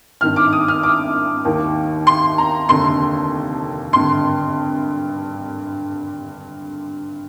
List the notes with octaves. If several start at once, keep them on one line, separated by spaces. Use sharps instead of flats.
G#1 G2 D#3 F6
D6
D#6
F6
D6
D#2 D#3
C6
A#5
F1 D#2 D3 C6
G#1 G2 D3 C6